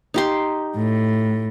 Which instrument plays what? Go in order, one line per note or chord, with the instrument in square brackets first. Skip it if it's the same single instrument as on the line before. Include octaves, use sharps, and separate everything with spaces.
[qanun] D#4 G4 C6
[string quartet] A2